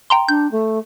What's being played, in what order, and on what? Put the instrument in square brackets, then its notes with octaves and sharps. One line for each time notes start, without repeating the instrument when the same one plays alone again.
[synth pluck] G5 A#5 C6
[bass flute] D4 [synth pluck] G6
[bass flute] A3